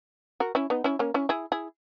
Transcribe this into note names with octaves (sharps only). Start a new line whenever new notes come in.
F#4 A#4
C#4 E4
B3 D#4
C#4 E4
A#3 C#4
C#4 E4
E4 G#4
E4 G#4